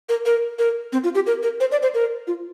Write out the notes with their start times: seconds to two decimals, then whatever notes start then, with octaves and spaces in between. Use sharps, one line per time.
0.09 A#4
0.26 A#4
0.59 A#4
0.93 C4
1.04 F4
1.15 G4
1.27 A#4
1.43 A#4
1.60 C5
1.72 D5
1.83 C5
1.94 A#4
2.27 F4